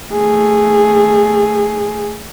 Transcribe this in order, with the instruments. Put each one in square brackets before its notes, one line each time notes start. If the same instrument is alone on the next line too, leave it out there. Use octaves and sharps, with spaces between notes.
[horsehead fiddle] A3 G#4